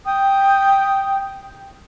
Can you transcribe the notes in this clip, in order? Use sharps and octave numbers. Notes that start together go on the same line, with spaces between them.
G5 D#6